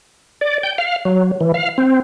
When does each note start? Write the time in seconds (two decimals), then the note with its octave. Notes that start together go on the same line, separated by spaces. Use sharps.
0.41 D5
0.63 G5
0.78 F5
1.05 F#3
1.41 E3
1.54 F5
1.78 C4